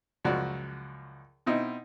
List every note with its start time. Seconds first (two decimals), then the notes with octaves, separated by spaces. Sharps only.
0.24 C#2 F#2 F3 F#4 D5
1.46 B2 C4 D#4 E4